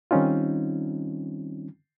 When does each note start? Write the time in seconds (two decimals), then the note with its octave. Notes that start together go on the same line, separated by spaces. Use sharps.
0.11 D#3 G3 C4 C#4 D#4 F4